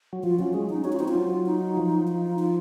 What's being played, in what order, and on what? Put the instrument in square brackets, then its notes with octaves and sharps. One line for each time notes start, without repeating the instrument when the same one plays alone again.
[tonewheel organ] F#3
[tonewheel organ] F3 [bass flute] F4
[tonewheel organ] F#3 [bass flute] C#4
[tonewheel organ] G#3 [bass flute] C#4
[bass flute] D#4
[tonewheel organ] C#4 [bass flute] F#4
[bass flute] F4
[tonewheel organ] C4 [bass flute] D#4
[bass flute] F4
[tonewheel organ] F#3
[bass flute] D#4
[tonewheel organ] F3
[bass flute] D#4
F4